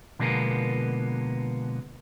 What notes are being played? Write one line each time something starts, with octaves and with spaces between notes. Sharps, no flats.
B2 D3 F3 G#3 A#3 B3